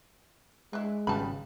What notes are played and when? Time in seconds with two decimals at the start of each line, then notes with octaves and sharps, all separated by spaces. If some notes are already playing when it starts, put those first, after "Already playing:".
0.73 G#3 D4 E4
1.07 G#1 C#3 G3 B3 A5 B5